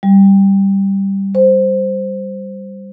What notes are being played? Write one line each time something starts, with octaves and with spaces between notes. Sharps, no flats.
G3
C5